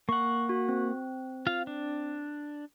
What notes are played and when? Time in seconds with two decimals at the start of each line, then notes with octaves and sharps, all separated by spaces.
0.09 A#3 F#5 C#6
0.49 F#4
0.69 C4
1.47 F4 F5
1.67 D4